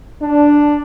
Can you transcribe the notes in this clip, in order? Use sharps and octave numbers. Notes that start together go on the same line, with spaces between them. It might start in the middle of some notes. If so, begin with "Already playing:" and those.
D4